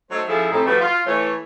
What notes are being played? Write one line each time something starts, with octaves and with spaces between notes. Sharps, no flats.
F#3 A3 D#4 A4 C5
F3 C#4 E4 G#4 A4 E5
A2 C3 C4 D#4 A4
F3 G3 A3 F#4 B4
F4
E3 A3 C#5